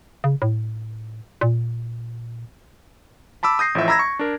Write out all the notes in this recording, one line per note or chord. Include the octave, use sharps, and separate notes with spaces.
C#3
A2
A#2
A5 B5 D6 E6
D#6 G6 A#6 C7
A1 A2 F3 E5
A#5 B5 E6 G#6 A#6
C#6
D4 A#4